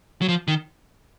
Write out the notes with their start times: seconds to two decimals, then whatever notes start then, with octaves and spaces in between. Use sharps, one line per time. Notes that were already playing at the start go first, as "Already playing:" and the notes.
0.21 F#3
0.28 F3
0.48 D#3